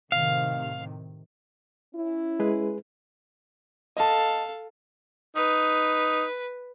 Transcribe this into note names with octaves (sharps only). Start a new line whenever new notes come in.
A2 C3 D#3 F5
C#4 E4
G#3 G#4 B4
A4 D#5 F5 A5
D#4 B4